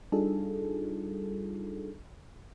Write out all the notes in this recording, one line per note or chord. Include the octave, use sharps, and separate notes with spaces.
G3 D4 D#4 F4 G#4 A4